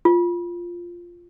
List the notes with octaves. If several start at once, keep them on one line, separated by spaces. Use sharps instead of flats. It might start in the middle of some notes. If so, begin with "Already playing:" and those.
F4